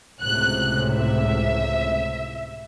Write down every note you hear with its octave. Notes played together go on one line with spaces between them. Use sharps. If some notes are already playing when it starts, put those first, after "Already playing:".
C#2 A2 C3 F#6
E5